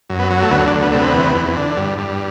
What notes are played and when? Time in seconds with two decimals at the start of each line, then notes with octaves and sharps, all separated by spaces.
0.09 F#2
0.19 B3
0.30 F#3
0.42 A3
0.50 D2 B3
0.67 D4
0.73 D2
0.83 B3
0.92 C3 A3
0.99 B3
1.14 E2
1.35 E2
1.57 D3
1.77 G2
1.98 G2